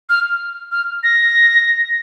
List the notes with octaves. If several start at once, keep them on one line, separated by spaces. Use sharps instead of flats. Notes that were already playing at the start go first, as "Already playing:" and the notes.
F6
F6
A#6